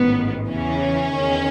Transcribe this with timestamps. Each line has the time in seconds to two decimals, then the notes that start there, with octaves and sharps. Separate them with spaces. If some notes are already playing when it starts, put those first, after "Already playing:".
Already playing: A1 G#2 D#3 B3
0.49 E2 C#3 E3 C#4
1.17 E2 D#3